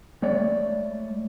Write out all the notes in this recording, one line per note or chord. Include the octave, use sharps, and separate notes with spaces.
G#3 A3 C#5 D5